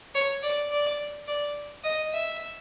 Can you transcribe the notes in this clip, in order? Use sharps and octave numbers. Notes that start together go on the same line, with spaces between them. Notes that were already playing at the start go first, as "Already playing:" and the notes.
C#5
D5
D5
D5
D#5
E5